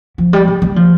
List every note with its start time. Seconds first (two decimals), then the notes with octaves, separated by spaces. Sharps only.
0.18 F3
0.33 G3
0.48 G3
0.62 G3
0.76 F3